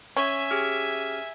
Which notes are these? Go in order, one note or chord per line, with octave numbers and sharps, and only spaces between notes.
C#4 E5 G#5
G4 G#4 F6